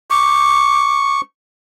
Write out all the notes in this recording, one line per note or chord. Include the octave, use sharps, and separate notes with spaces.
C#6 D6